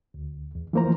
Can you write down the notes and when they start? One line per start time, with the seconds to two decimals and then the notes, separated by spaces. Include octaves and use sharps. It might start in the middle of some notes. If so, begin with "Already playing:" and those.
0.14 D2
0.55 E2
0.73 E3 F3 A#3 C5 A#5